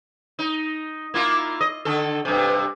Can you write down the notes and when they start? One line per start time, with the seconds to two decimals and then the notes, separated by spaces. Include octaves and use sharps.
0.39 D#4
1.14 A#3 E4 F4
1.61 D#5
1.85 D3 A4
2.25 G2 C3